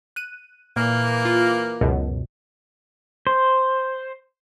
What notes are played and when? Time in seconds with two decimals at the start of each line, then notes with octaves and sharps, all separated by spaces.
0.16 F#6 D#7
0.76 A#2 E3 A#3
1.25 F4
1.81 C#2 F#2 B2
3.27 C5